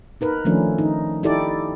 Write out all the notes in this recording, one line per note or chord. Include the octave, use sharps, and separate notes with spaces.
D#4 A#4 B4
D#3 F3 A3 C#4 D4
D#4
D#4 E4 G4 A4 D5